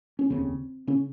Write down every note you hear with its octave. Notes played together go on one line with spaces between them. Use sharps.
C#4
F1 D#2 C#3 C4
C#3 C#4